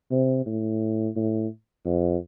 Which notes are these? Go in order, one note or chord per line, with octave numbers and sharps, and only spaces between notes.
C3
A2
A2
F2